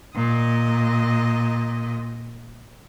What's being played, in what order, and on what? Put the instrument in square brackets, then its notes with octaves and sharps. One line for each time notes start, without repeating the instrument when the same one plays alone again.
[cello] A#2 D#5